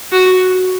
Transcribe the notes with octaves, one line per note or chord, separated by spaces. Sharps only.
F#4